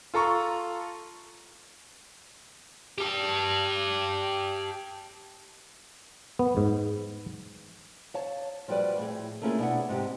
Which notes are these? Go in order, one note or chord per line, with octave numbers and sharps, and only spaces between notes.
F4 A4 A#5 C#6
G4 A5
B3
G#2
C#5 F5 A5
F3 G3 F#4 B4 D5
A2 G#4
A3 A#3 C#4 E4 F4 G#4
B2 D4 E4 F#5
G#2 C3 G4